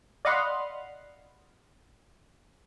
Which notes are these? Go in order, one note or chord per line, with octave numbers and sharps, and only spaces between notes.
D5 D#5 F5 F#5 B5 C6